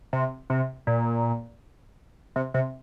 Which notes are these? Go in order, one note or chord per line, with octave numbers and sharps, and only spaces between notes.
C3
C3
A#2
C3
C3